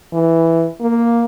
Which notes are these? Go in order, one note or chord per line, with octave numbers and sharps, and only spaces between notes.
E3
A#3